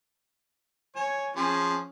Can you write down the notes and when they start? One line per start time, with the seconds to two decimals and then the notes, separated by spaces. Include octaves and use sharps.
0.96 C#5 G#5
1.36 F3 C#4 G#4